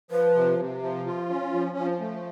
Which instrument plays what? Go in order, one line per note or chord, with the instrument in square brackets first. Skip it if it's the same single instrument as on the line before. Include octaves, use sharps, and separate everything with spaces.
[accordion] F3 [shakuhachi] B4
[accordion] C3
C3
F3
F4
C#4
F3
F3
A3